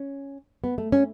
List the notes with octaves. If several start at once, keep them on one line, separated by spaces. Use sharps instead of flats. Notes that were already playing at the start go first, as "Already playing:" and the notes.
Already playing: C#4
B3
A3
C#4